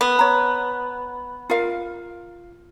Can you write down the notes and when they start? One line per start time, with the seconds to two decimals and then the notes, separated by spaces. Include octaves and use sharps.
0.01 B3
0.19 C#5 A#5
1.50 F4 A#4 F5